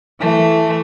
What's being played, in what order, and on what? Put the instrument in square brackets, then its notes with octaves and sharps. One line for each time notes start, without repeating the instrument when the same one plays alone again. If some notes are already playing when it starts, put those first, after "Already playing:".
[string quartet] E3 A3